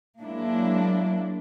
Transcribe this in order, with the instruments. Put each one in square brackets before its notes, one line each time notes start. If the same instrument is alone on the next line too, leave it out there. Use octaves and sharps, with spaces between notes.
[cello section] F#3 G#3 A#3 D4 E4